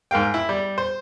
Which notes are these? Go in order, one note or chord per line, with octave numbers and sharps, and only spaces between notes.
G#2 A#4 F5 G5
E4
G3
C5